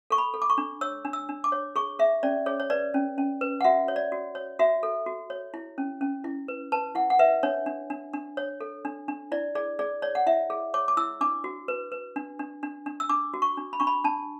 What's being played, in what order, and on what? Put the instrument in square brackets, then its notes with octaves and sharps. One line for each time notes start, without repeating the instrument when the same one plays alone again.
[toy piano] A4 C#6
B5
A4
D6
C#6
D4
C#5 E6
D4
E6
D4
D6
C#5
G#4 C#6
G#4 E5
C#4 D5
G#4 C#5
C#5
B4 D5
C#4
C#4
B4
F#5
F#4 E5
C#5
D5
F#4
C#5
F#4 E5
A4
F#4
C#5
E4
C#4
C#4
E4
B4
B4 A5
E4 F#5
F#5
B4 E5
D4 C#5
D4
D4
D4
C#5
A4
D4
D4
E4 D5
G#4 D5
G#4 D5
C#5 D5
F#5
E4 E5
G#4
C#5 D6
D6
E4 E6
D4 D6
F#4
B4
B4
D4
D4
D4
D4
E6
D4 D6
F#4
C#6
D4
B5
D4 C#6
B5
D4 A5